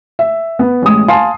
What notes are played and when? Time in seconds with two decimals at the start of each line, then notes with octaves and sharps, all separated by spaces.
0.19 E5
0.59 B3
0.82 A1 G#3 D#6
1.08 F5 G#5 A5 C6 C7